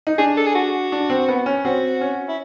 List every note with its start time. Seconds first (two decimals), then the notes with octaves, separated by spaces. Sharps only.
0.07 D#4
0.18 D4 G#4
0.37 A4
0.46 G#4
0.55 F#4
0.92 D4
1.10 C4
1.28 B3
1.46 C#4
1.65 C4 F#4
2.01 C#4
2.28 E4